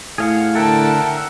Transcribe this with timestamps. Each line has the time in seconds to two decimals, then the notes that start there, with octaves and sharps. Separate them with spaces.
0.18 A2 G#4 F5 F#5
0.55 D3 A4 A#4 E5 F#5 G5 A5